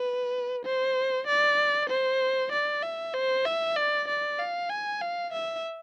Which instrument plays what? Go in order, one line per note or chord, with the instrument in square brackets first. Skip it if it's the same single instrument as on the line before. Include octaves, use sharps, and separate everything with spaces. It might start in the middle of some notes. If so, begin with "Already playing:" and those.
Already playing: [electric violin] B4
C5
D5
C5
D5
E5
C5
E5
D5
D5
F5
G#5
F5
E5